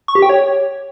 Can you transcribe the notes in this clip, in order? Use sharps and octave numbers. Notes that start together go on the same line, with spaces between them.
C#6
G4
G5
C#5